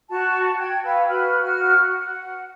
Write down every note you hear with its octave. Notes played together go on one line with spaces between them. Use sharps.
F#4 A5
G5 G#6
B4 F5 E6
F#4 B4 B5 F6
F#4 F6
F#5